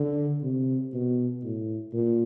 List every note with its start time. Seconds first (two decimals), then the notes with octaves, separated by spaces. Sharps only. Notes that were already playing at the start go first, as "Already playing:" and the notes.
Already playing: D3
0.42 C3
0.93 B2
1.43 A2
1.94 A#2